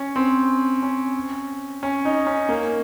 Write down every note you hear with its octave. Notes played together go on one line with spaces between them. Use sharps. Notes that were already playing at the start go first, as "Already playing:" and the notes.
Already playing: C#4
C4
C#4
C#4
D#4
C#4
A#3